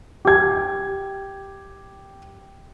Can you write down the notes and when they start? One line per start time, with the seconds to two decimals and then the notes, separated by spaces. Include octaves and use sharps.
0.25 G4 G#6